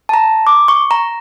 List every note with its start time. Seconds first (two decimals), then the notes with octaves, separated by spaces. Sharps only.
0.09 A5
0.14 A#5
0.47 D6
0.68 C#6
0.91 A#5